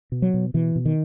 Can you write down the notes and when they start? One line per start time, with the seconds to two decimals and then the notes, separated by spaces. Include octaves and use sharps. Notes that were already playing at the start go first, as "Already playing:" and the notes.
0.12 B2
0.22 F#3
0.34 B2
0.54 B2 E3
0.76 B2
0.85 D#3